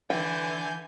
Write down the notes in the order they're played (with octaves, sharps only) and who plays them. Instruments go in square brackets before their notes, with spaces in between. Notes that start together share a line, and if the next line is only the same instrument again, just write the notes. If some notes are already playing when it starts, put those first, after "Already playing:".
[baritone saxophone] D3 [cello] E3 [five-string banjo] G5 [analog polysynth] G#5 G6